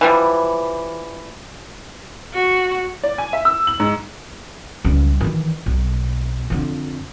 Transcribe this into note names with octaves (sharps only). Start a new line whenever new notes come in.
E3 F3 G3
F#4
D5
G#5
E5
E6
F#7
G#2
C#2 G3
D#3 E3
B1
F2 D3